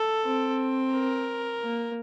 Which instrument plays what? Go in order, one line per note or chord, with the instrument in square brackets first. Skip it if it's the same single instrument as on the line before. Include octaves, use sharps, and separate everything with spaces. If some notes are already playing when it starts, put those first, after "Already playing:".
Already playing: [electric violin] A4
[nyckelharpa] C4
[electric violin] A#4
[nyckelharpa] A#3